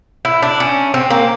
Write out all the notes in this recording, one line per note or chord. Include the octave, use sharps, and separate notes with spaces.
E4
D4
C#4
C4
A#3